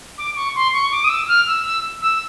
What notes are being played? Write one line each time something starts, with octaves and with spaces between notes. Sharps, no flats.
D6
C#6
C6
C#6
D6
D#6
E6
F6
E6
E6
E6